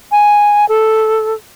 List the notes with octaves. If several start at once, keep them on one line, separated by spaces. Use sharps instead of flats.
G#5
A4